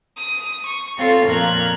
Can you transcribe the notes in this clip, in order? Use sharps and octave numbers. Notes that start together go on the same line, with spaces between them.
D#6
C#6
C4 F4 A4 C#5
F2 A#2 A#4 F#6 G#6